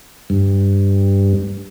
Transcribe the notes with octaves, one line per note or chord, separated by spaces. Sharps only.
G2